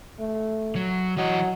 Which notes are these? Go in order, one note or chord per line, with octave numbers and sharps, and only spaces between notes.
A3
F#3
E3 F#3 D#5